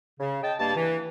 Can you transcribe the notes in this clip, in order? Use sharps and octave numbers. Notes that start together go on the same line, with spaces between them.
C#3
D#5 G5 A5
G2 A#3 A5
E3